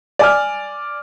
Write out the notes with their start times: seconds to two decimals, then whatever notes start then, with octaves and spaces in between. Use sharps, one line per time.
0.19 D5 G#5 F6